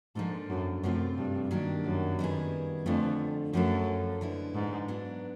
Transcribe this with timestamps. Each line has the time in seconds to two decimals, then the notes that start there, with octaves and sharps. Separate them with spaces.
0.15 G#2 F3 A#3 D4 F4 A4
0.50 F#2
0.83 F#2 C3 F3 A3 C4 F4
1.17 G2
1.51 D#3 F#3 A#3 D4 G4
1.85 F#2
2.19 D#3 G3 B3 E4 G#4
2.86 F2 D3 F3 A3
3.53 F#2 F3 A3 C#4 F4 A4
4.21 D3 F3 G#3 B3 E4
4.55 G#2
4.88 F#3 B3 D4